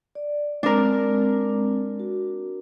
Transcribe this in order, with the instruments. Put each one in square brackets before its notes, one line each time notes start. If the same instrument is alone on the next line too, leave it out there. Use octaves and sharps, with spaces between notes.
[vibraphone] D5
[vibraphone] G#3 C4 [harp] D4 A#4
[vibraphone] F#4